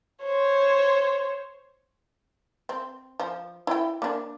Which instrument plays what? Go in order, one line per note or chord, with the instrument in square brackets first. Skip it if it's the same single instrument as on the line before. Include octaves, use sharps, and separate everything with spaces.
[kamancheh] C5 C#5
[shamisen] C4
F3
E4 G5
A#3 D4